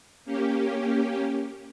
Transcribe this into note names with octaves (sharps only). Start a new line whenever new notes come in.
A#3 C#4 G4